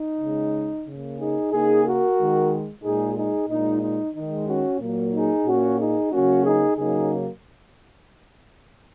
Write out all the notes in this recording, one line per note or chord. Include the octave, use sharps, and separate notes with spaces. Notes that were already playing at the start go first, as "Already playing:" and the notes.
Already playing: D#4
C#3 G#3
C#3 A#3
D#4 G#4
C#3 A#3 D#4 G#4
F#4 A#4
D#3 G#3
A#2 G#3 D#4 G#4
D#4 G#4
A#2 G#3 D#4
D#4
D#3 G#3 D#4
C#4 F#4
A#2 F#3 A#3
D#4 G#4
A#2 A#3 C#4 F#4
D#4 G#4
C#3 F#3 A#3 C#4 F#4
D#4 G#4
C#3 F#3 A#3 D#4 G#4